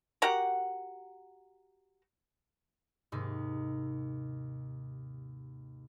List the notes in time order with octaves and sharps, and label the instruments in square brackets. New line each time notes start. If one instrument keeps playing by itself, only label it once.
[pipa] F#4 G4 A#4 F#5
[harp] D#2 G#2 C3 D#4